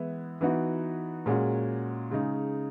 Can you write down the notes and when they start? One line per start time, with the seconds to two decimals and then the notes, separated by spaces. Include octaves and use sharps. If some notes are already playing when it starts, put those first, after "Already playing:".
Already playing: E3 G#3 B3 E4
0.41 E3 B3 D#4 F#4
1.26 A#2 G#3 C#4 F#4
2.11 C#3 G#3 D#4